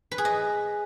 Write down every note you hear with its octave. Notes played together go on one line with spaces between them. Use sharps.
B4
G#4
D#5